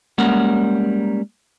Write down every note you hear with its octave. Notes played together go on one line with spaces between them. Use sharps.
G3 G#3 A#3 C#4 A#4 F#5